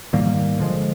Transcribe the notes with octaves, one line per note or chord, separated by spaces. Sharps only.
G#2 D#3 G3 A#3
D2 D3 F3 G#3